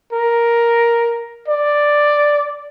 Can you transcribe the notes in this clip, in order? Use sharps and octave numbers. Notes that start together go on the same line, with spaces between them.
A#4
D5